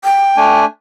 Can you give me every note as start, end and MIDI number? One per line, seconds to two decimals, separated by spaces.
0.04 0.59 79
0.37 0.65 57
0.37 0.65 62
0.37 0.65 80